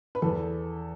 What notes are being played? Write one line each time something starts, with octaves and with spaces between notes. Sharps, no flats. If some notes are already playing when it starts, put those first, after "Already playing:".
B4
E2 A4